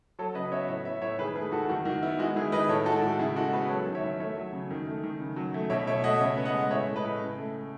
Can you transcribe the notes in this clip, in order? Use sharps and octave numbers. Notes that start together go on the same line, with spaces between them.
F#3 A4 C#5
C#3 B4 D#5
B3 C#5 E5
A2 C#5 E5
B3 C#5 E5
A2 C#5 E5
D#3 G#4 B4
A3 G#4 B4
D#3 F#4 A4
D#3 F#4
D#3 F#4
B3 E4
G#3 F#4
D#3 E4 G#4
D#3 B4 D#5
A2 A4 C#5
G#3 F#4 A4
A2 F#4
C#3 E4 G#4
G#3 F#4 A4
B3 G#4 B4
F#3 A4 C#5
D#3
C#5 E5
D#3
A3 C#5 E5
F#3
C#3
D#3
A3
D#3
C#3
F#3
A3
B2 C#5 E5
B2 C#5 E5
A3 D#5 F#5
C#3 C#5 E5
B3
D#5 F#5
G#3
A2 C#5 E5
A3
B4 D#5
A2
C#3
A3
A3